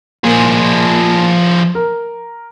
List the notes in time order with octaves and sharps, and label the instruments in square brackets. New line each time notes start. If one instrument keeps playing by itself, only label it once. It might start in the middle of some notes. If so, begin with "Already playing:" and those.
[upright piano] A#2 [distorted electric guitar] F3 G#4
[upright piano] A#4